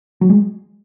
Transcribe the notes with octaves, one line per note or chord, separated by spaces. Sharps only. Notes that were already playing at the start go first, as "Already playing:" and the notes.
F#3
G#3